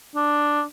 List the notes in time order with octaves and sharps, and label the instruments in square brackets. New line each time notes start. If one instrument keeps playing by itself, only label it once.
[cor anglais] D4